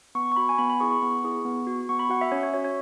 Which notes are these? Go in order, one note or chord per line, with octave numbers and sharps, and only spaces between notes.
B3 C#6
C#6
F#4 B5
G#5
B3 B5
B5
E4 G#4 C#6
C#6
B3
E4 G#4
B3
F#4
B3 C#6
B5
F#4 F#5
E5
C#4 C#5
C#5
F#4 C#5
C#5